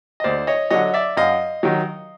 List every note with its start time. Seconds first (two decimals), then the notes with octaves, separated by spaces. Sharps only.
0.20 D#5
0.24 D2 C5 D5
0.47 C#5 D#5
0.70 D3 F#3 C#5 D#5
0.94 D5 E5
1.17 F#2 D#5 F5
1.63 D#3 F#3